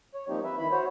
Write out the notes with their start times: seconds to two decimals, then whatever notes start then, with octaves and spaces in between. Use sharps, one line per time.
0.14 C#5
0.29 F3 G3 A#3 C4 D#4 G4
0.44 B4 E5
0.59 D#3 E4 B5
0.71 F#4 C5 C#5